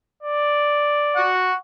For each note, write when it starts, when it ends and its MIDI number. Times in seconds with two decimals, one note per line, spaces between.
0.23 1.31 74
1.16 1.55 78
1.16 1.55 85